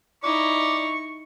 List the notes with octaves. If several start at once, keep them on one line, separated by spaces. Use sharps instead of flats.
D#4 E4 D5 C#6